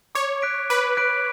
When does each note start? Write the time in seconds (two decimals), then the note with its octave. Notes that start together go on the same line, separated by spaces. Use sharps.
0.15 C#5 D6
0.42 F#6 B6 D7
0.70 B4 D6
0.97 F#6 B6 D7